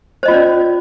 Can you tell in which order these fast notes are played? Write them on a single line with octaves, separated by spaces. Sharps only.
C5 D#5 F4 C#4 D5